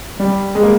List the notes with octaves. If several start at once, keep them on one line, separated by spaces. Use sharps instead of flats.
G3
G#3
A#3